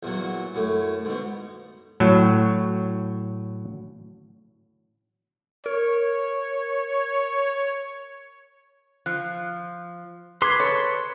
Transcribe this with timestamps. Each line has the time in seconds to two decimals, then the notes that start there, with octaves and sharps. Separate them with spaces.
0.03 E2 A#2 F#3
0.55 F#2 A2
1.05 G#2 B2
2.00 A2 F#3
5.66 A#4 C#5
9.06 F3 F#6
10.42 G#4 B4 C6 D6 G#6
10.60 A4 C#5